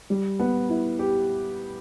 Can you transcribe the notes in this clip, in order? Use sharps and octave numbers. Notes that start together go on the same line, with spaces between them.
G3
B3
E4
G4